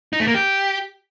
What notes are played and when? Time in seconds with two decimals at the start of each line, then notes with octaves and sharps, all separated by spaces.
0.13 D#4
0.20 A3
0.27 A#3
0.35 G4